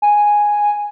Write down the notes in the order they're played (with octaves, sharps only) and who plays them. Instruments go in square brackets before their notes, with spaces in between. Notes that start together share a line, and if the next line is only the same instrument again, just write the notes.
[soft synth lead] G#5